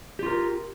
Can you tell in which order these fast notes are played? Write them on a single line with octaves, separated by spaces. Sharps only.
G4 F4 A#4